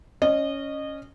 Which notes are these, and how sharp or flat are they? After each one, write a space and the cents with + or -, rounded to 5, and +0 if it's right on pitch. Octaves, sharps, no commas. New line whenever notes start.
C#4 +0 D#5 -25